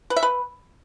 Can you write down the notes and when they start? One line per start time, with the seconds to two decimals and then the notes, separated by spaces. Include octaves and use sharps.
0.10 B4
0.16 E5
0.23 B4